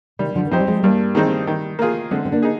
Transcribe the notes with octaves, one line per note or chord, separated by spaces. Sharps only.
C3 D#3 G3
D3 F3
D#3
F3 C4 D#4 G4 C5
G3
F3 G#3
G2 G3 A#3
D#3 G#3 C4 D#4
D#3
A#3 F4 G#4
D3 G#3 C4
C4
A#3 D4
D#4 G#4